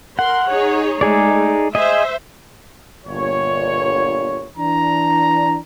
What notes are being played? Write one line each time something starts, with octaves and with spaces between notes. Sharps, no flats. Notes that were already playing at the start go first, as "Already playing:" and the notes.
A#4 F#5 C6
D#4 G#4 C#5
G#3 A3 D#4 G#4 D5
G#4 C5 D#5 E5
G1 A#2 C#5
E3 D4 A#5